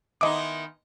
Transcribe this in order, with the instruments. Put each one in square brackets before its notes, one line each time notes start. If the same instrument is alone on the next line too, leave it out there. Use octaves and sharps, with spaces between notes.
[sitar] D#3 B3 D#4 [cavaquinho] E4 G#5 C6 [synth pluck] D#5 D6